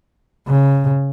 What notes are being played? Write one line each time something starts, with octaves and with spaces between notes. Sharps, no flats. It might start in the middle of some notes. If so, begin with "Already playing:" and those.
C#3